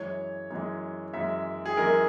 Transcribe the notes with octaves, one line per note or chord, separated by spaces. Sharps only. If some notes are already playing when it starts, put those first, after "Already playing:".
Already playing: F#2 E3 G#3 C#5
F#2 E3 G#3
F#2 E3 G#3 E5
G#4
F#2 E3 G#3 A#4